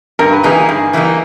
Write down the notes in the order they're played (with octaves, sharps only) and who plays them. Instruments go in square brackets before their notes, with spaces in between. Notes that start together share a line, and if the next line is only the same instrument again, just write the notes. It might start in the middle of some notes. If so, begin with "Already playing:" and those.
[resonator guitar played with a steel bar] G2 [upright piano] A#4
[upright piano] B4
[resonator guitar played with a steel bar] E3 G3 A#3 D#4 [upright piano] G#4 A#4
[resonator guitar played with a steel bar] G2
E3 G3 A#3 D#4